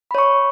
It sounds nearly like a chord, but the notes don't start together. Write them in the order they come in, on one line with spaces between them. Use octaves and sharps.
B5 C#5 C#6